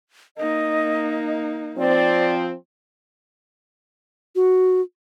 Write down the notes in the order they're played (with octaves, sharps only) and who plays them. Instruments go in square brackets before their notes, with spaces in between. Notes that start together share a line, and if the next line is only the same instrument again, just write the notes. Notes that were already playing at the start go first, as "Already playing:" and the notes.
[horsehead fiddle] A#3 D#4 [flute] D#5
[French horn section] F3 C4 [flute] D5
[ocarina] F#4